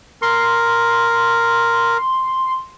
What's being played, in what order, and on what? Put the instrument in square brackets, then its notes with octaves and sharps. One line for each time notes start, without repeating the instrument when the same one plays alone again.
[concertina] A#4 [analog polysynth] C6